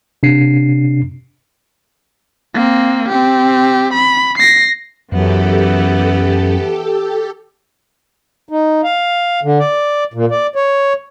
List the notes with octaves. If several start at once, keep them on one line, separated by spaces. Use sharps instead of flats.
C3 D4 C7
A#3 C4
C4 G4
B5
A#6 C7
F#2 E3 B3 G4 A4
D#4
F5
D3
D5
A#2
D5
C#5